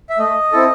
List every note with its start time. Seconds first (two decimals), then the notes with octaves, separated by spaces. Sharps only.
0.10 E5
0.18 A3 D#5
0.52 C4 E4 A4